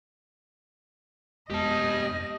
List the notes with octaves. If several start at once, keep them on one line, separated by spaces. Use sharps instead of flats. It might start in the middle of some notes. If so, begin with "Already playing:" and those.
F2 G#3 B3 G4 D#5 A5